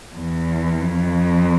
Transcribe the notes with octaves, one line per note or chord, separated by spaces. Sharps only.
E2
F2